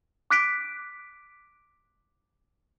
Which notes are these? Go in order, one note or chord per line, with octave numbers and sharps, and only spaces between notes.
D6 F#6 B6 D7